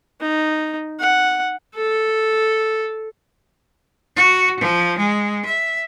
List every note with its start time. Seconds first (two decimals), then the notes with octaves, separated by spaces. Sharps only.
0.21 D#4
1.00 F#5
1.75 A4
4.16 F#4
4.60 F3
4.98 G#3
5.45 E5